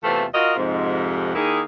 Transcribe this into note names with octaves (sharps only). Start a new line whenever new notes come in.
E2 C3 E3 A3 C4 F4
F4 F#4 A#4 D#5
F2 G#2 C3
D#3 A#3 D#4 E4 G#4